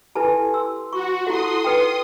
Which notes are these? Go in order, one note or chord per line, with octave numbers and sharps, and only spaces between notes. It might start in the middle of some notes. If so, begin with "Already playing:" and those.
E4 G4 A4 B4 G#5 A5
C6 E6
F#4 C#6
E4 A4 F#5 C6 D#6
D#4 B4 G5